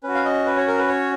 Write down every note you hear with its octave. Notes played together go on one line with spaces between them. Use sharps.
C#4 F#4 B4
F5
D#5
B4
C#5
A#4
B4
C#5